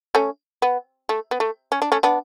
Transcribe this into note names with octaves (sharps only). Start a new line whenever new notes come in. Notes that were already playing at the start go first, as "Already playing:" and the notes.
A3 C#4
B3
A3
B3
A3
C#4
D4
A3 C#4
B3 D4